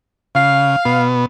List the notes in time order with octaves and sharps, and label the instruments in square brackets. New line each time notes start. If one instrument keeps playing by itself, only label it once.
[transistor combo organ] C#3 [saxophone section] F5
[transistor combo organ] B2 B3